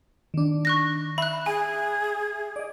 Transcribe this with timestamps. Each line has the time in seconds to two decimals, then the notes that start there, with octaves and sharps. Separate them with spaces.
0.34 D#3 D4
0.65 C#6 F#6 A#6
1.18 E5 B5 F#6
1.46 G#4 G#5
2.56 D5 D#5